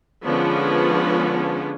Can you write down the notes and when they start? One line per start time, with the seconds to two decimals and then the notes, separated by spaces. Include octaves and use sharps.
0.24 D3 F3 G#3 B3 C#4 D4